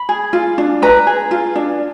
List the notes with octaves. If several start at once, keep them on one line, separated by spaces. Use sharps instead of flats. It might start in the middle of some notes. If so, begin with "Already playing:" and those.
Already playing: B5
G#4
F4
D4
B4 A#5
G#4
F4
D4